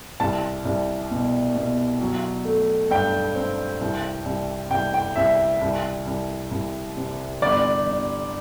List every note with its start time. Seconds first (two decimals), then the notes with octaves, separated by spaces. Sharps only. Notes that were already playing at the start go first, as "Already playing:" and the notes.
0.20 C2 A5
0.65 C2
1.11 B2
1.55 B2
2.01 F#3
2.45 A3
2.91 G2 G5
3.36 C4
3.81 C2
4.25 C2
4.71 C2 G5
4.94 G5
5.16 C2 E5
5.61 C2
6.07 C2
6.51 C2
6.97 C3
7.42 G1 D5
7.86 G1